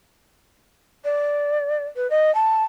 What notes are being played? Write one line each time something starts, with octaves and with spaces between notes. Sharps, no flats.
D5
B4
D#5
A5